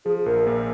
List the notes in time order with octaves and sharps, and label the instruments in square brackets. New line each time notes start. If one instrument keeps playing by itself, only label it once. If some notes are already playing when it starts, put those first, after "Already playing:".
[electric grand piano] F3 [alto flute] G#4
[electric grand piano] A#1 [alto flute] A#4
[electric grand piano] A#2